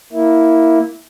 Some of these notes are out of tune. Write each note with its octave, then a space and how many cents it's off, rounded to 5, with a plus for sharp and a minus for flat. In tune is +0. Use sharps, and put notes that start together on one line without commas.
A#3 +0 E4 -10